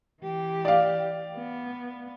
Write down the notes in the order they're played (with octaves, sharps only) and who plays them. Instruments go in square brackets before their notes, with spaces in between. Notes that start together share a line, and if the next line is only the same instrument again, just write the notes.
[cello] E3 G4
[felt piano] D5 F5
[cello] B3